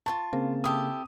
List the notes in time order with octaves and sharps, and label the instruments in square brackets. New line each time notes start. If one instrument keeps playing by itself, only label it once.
[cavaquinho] F4 C5 C#6 [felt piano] A5
[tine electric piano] C#3 A#3 [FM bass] C4
[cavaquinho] E4 G4 A4 [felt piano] D#6